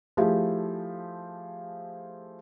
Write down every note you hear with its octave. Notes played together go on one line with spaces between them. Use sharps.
F3 A3 E4 G4 G#4